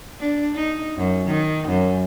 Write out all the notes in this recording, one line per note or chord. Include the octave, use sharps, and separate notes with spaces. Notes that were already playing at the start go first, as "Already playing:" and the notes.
D4
D#4
F#2
D#3
F#2